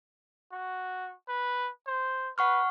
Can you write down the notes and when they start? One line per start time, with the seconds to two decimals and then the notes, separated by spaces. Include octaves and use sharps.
0.51 F#4
1.28 B4
1.87 C5
2.38 B4 F#5 C#6 F6